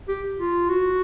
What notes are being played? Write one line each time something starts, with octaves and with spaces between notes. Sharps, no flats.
G4
F4
F#4